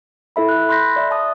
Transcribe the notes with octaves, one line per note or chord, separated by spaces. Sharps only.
E4 A4 E5 B5
F#6
B5 C6 F#6 G6 A#6 B6
D5 E5
E5 A5 D#6